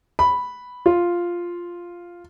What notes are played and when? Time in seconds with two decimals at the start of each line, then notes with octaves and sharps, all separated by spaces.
0.19 B5
0.86 F4